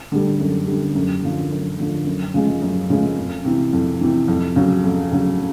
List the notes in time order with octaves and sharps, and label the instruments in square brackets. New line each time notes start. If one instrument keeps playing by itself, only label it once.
[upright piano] D3 G3
F#2
D3 G3
F#2
D3 F3
F#2
D3 F3
F#2
C#3 F3 G#3
F#2
C#3 F3 G#3
F2
C3 E3
F2
C3 E3
F2
C#3 F#3
F2
C#3 F#3